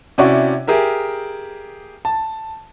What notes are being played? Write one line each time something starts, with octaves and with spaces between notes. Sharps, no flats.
C3 C#4 E4 F#4 D5 C#6
G4 G#4 A#4 E5
A5